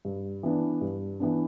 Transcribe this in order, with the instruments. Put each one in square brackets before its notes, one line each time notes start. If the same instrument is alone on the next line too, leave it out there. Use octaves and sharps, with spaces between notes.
[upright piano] G2
E3 B3 D4
G2
E3 B3 D4